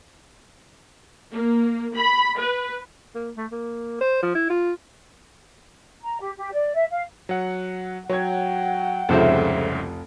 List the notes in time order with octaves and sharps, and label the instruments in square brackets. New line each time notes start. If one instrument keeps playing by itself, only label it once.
[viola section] A#3
B5
B4
[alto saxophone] A#3
A3
A#3
C5
F3
E4
F4
[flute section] A#5
G4
G4
D5
E5
F5
[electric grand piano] F#3 F#5
[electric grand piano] F#3 [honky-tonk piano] C#5 G#6 [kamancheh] F#5 G5
[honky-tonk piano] F1 F3 [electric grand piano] C2 G#2 C#3 [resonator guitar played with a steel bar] A4 C5 E5